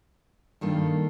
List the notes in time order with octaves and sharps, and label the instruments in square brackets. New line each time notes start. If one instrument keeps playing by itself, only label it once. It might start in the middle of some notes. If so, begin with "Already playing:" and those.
[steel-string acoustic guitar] G2 D#3 A#3 F4 A4